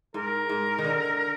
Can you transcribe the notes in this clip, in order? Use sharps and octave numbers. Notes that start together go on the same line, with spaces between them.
G#2 A#4
G#2
D#3
D3